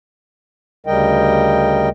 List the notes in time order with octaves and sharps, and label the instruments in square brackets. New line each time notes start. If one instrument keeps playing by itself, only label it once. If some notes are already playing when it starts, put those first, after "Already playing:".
[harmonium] D2 C#3 G3 A#4 D#5 G5